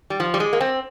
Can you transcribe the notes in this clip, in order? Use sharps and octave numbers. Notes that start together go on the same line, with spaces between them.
G3
F3
G3
G#3
A#3
C4